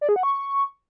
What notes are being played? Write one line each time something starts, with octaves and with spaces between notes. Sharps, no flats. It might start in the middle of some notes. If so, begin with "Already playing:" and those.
D5
G#4
F#5
C#6